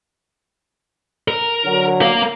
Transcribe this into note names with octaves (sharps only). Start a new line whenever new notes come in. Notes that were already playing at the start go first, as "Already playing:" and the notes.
A#4
D3 F#3
A#4 F5